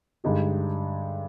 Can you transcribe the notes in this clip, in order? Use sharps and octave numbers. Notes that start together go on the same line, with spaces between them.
G2 D3 G#3 D#4 G4